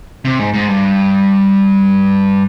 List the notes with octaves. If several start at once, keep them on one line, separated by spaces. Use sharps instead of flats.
C3
G#2
G#2
G2